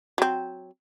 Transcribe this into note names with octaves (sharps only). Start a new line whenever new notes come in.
F#3 C4